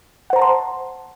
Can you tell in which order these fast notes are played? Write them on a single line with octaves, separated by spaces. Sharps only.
F#5 C5 A#5 A5 C6